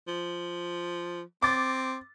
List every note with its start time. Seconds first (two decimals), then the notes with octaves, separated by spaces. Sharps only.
0.07 F3
1.42 C4 D6 A6